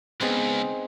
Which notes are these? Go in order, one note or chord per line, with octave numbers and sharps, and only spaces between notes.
C#2 B3 C4 D#4 G#4